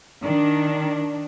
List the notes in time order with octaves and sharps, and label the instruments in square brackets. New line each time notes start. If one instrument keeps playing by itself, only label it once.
[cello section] D#3 D4